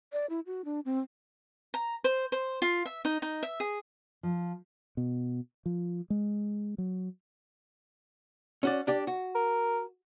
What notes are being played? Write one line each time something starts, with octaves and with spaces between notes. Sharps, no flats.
D5
E4
F#4
D4
C4
A#5
C5
C5
F4
E5
D#4
D#4
E5
G#4
F3
B2
F3
G#3
F#3
C#4 F#4 D5
D4 G4 D5
F#4
A#4